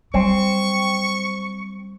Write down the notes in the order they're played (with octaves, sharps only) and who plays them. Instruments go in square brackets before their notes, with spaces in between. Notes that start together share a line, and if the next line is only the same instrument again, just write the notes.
[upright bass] F#3 G3 [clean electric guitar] C4 [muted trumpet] C#6